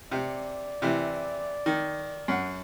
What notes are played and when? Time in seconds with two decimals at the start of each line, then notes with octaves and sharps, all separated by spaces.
0.11 C3 D5
0.82 C3 E3
1.66 D#3
2.28 F#2 F#5